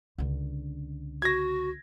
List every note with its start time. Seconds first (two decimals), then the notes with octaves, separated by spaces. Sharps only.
0.18 C#2 D3
1.22 F#4 G#6 A#6